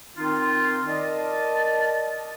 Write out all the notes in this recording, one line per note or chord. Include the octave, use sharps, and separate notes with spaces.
D#3 C4 D#4 F4
A#4 D5 D#5 A5